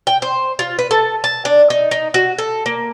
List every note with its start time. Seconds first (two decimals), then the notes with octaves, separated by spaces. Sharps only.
0.07 G5
0.22 C5
0.59 F4
0.79 B4
0.91 A4
1.24 A5
1.45 D4
1.70 D#4
1.91 D#4
2.14 F#4
2.38 A4
2.66 A#3